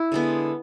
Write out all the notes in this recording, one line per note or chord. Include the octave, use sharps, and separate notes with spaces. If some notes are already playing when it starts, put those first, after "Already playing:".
Already playing: E4
D3 G#3 B3